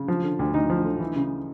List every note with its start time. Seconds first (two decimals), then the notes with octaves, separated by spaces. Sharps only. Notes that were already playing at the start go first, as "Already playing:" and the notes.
Already playing: C#3
0.08 F3
0.24 D3
0.39 D2
0.54 D2 D#4
0.70 F3
0.85 D3
1.00 E3
1.16 C#3